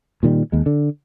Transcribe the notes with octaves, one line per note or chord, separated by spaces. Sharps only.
A#2 D#3 G3
D#2 G#3
D3